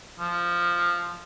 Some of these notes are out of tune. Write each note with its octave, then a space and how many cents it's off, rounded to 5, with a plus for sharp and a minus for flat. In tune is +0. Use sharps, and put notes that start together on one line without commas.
F3 -5